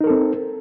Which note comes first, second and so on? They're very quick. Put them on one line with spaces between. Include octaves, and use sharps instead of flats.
D#4 A#4 A4 C4